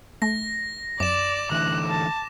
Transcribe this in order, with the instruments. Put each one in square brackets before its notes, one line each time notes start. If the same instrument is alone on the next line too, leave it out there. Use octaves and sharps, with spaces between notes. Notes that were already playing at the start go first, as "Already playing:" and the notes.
[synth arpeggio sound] A3 [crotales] A#6
[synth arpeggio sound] F#2 [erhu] D5 [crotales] D6 E7
[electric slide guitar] D3 E3 A3 [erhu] F#6
[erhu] A5